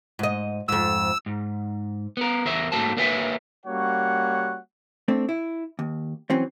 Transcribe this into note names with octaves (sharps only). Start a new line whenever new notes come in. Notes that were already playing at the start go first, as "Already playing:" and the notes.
G#2 D#5
F2 G#2 E6
G#2
B3 A#4
E2 A#4 C5 E5
G#2 A3 A#3 F#4 A5
A#3 A#4 B4 C#5 E5 G#5
G3 A#3 C#4 F#4 C#5 F#5
A3 C4 D4
E4
D#2
E3 F#3 C4 C#4